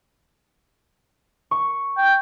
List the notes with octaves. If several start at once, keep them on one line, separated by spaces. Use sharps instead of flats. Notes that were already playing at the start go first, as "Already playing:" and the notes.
C#6
G5